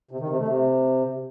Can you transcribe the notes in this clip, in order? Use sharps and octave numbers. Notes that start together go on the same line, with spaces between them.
C3
D#3
C3
A3
C3